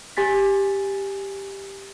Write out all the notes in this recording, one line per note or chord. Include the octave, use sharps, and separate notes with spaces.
G4 G#5 A6 B6